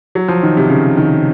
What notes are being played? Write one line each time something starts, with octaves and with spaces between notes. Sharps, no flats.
F#3
F3
D#3
C3
C#3
D#3